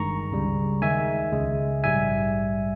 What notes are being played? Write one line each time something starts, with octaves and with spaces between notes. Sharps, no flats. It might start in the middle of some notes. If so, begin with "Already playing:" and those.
Already playing: G1 G2 D#3 G#3 A#5 C#6
C#2 C#3 G3
D#2 D#3 G#3 E5 G#5
C#2 C#3 G#3
A#1 G#2 G3 E5 G#5